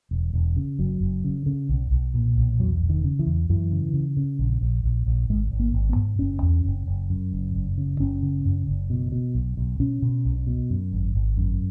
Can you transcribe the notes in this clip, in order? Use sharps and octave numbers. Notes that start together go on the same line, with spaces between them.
E1
E1
C#3
F#1 F#3
F#1
C#3
C#3
B1
B1
A#2
B1
E2 F#3
E1
D#3
C#3
E3
E2
F#2 E3
C#3
C#3
C#3
A#1
A#1
A#1
A#1
G#1 G#3
G#1
A#3
G#1
B3
G#2
F#1 C#4
E2
F#1
F#1
F#2
F#1
F#1
C#3
F#1 C#4
C#3
F#2
F#1
B2
B2
B1
B1
B2 C#4
B2
B1
B2
F#2
G#1
G#1
F#2